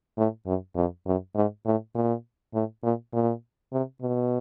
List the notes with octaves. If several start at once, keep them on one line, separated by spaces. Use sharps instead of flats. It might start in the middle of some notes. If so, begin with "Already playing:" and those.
A2
F#2
F2
F#2
G#2
A2
A#2
A2
A#2
A#2
C3
B2